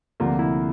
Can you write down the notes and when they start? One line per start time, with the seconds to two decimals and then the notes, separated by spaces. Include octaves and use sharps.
0.20 D2 C3 F3 A#3 F4
0.39 E4